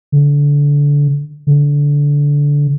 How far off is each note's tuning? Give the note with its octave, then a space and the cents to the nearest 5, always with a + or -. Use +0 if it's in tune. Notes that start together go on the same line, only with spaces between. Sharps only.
D3 -25
D3 -20